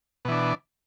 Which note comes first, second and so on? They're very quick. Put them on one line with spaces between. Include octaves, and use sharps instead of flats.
B2 E3 D4